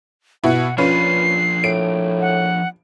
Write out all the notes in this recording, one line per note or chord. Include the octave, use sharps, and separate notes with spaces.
B2 E4 F#5
F3 C#4 D4 F4 B4 C7
A2 D7
F#5